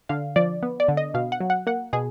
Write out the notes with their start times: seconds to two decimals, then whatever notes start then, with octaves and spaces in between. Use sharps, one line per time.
0.09 D3 F5
0.36 F3 D5
0.63 B3
0.80 D5
0.88 D3
0.97 D#5
1.14 B2 F5
1.32 F#5
1.41 F#3
1.50 F#5
1.67 A#3 F#5
1.93 B2 G#4